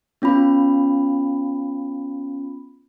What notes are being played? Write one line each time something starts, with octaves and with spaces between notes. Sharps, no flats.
B3 C#4 F4 B5